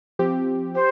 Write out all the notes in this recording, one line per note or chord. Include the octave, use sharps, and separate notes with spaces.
F3 C4 G4
G4 C5